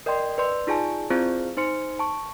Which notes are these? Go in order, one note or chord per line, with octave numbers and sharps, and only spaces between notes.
A#4 D5 D#5 G5 C6
B4 D5 C6
D#4 F4 G#4 D5 G#5 A5
C4 E4 F4 G#4 C5 D5
D#4 C5 C6 C#7
A5 C#6